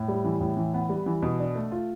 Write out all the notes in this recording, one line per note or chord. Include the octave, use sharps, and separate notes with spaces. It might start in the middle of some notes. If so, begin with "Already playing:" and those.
Already playing: A2
G3
E3
A2
E3
B3
G3
E3
B2
D4
A3
F4